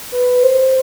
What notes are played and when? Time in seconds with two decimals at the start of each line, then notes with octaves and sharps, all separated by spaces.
0.12 B4
0.43 C5